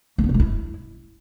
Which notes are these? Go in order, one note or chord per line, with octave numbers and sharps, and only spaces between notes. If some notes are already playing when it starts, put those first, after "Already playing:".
A#3
B3
C3
G#3
E4